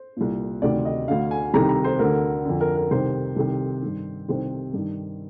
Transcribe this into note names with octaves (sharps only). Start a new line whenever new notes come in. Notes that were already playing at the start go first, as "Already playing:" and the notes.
Already playing: C5
C2 A#2
D2 C3 D#3 D5
D#5
D2 D3 F5
G#5
C2 C3 D#3 A#5
A#5
C5
D2 D3 A#4
F2 D3
A#4
A#4
C2 C3 D#3 C5
C2 C3 D#3
G2 D#3
C2 C3 D#3 C5
G2 D#3